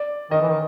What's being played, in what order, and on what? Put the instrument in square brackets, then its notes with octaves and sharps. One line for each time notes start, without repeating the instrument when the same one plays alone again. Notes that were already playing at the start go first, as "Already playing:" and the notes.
Already playing: [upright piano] D5
[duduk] D#3 [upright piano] D#5
[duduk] E3
D#3